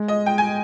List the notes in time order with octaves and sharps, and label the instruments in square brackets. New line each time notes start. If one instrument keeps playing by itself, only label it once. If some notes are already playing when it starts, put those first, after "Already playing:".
Already playing: [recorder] G#3
[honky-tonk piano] D#5
G5
G#5